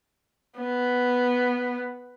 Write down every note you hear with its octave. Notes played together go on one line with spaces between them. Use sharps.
B3